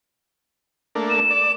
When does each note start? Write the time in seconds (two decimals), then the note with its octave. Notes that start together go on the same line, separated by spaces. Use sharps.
0.95 A3 A#3 D4
1.09 E7
1.30 D5